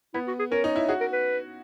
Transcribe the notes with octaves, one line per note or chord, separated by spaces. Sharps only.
B3 E4
F#4
G#4
C#4 A#4
D#4
E4
F#4 G#4
A#4
B4